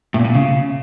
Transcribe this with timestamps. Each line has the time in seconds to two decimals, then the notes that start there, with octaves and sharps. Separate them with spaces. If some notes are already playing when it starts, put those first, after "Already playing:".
0.14 A2
0.19 A#2
0.24 A2
0.30 A#2
0.35 C#3